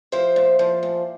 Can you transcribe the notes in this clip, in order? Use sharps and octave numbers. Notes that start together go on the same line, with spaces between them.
F3 C5 E5
A#2
F3
A#2